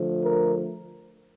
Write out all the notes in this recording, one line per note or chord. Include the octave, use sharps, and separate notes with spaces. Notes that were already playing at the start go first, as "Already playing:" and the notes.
Already playing: D3 F3 A3
A#4